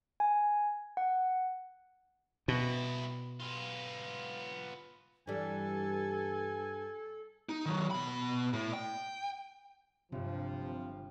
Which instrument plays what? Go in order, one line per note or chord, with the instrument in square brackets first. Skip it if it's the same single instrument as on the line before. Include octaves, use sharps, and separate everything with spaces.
[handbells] G#5
F#5
[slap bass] B2 [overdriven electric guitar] G3 E4
[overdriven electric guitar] B3 F4
[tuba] G2 [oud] E3 G3 [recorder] A4 [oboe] G#5
[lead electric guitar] D#4
D#3 F#3
B2 B5
A2
G5
[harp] G1 G2 [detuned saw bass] C3 [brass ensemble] F3